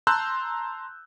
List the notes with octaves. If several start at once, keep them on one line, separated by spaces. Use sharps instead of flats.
A5 A#5 C6 E6 F#6 G6